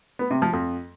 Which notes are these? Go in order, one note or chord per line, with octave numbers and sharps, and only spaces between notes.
B3
C3
F3
F2